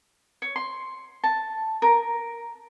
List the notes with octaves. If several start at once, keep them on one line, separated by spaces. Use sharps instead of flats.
C#5
C6
A5
A#4